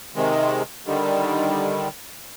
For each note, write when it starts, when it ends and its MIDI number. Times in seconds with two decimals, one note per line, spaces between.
0.15 0.62 48
0.15 0.62 51
0.15 0.62 56
0.86 1.88 50
0.86 1.88 51
0.86 1.88 55